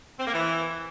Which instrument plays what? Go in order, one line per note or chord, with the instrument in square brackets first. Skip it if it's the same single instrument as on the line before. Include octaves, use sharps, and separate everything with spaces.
[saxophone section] C4
A#3
E3